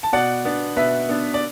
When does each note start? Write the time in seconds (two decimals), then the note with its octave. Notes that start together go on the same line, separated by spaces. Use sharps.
0.03 A5
0.13 B2 D5 F#5
0.45 B3 D4
0.77 B2 B4 E5
1.09 B3 D4
1.34 D5